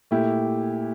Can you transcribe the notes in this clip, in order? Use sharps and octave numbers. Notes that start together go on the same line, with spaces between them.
A#2 A3 E4 G4